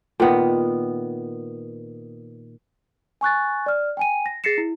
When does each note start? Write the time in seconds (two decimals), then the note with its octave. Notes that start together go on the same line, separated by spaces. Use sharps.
0.20 A#2 D#3 B3
3.21 G#5 C#6 F#6 A6
3.66 D5 F6
3.97 G5 G#5 D#7
4.26 A#6
4.44 G#4 A6 A#6 C7 C#7 E7
4.58 E4